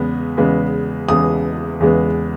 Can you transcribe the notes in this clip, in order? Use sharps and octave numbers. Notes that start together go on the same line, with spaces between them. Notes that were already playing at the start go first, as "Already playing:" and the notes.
Already playing: E2 C#3 G#3 B3
E2 C#3 G#3 B3
E2 C#3 G#3 B3 D#6
E2 C#3 G#3 B3